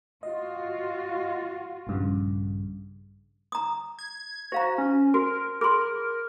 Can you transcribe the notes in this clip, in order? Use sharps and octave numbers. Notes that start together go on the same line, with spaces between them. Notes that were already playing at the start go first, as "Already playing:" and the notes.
F4 F#4 D#5
A#1 G2 C#3
A#5 D#6
G#6
F#4 C5 F5 A#5
C#4
F#4 A#4
G#4 A#4 B5 C6